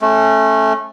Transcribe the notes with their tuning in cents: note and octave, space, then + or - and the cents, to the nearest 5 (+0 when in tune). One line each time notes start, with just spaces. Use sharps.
A3 -10 C#4 -30